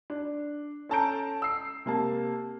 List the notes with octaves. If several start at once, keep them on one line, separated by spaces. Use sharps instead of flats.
D4
C#4 A4 A5 A#5 G6 D7
E6 C7
C3 A#3 A5